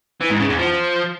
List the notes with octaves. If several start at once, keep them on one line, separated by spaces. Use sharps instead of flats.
E3
G#2
C#3
E2
F3